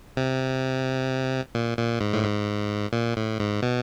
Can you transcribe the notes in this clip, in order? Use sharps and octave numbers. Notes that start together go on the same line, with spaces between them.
C3
A#2
A#2
G#2
A2
G#2
A#2
A2
G#2
B2